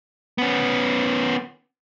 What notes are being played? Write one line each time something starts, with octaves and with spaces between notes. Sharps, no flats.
B3 C#4